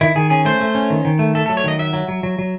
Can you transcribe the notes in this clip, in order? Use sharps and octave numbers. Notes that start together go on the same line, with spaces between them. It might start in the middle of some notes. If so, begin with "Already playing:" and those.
D#3 E4
D#3 G#4
C#4 G#4
A3 C5
A3
C#4
D#3
D#3
A3
A3 A4
A4
F#3
C#5
D#3 D#5
F#3 E5
F#3
F#3
F#3
F#3